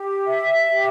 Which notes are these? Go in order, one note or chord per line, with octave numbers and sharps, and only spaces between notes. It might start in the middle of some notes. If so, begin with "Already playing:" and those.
Already playing: G4
E5
G4